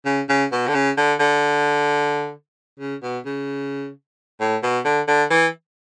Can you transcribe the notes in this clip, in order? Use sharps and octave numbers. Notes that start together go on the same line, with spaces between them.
C#3
C#3
B2
D3
C#3
D3
D3
C#3
B2
C#3
A2
B2
D3
D3
E3